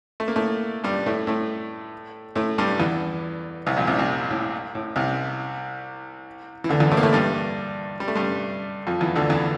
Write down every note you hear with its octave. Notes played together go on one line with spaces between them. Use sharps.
A3
A#3
A2 A3
G2 G3
A2 A3
A2 A3
A2 A3
G2 G3
E2 E3
C2 C3
A#1 A#2
C2 C3
C2 C3
A2
A2
C2 C3
E3
D2 D3
E2 E3
A2 A3
A#3
A2 A3
G2 G3
G3
A3
G2 G3
F2 F3
E2 E3
D2 D3
E2 E3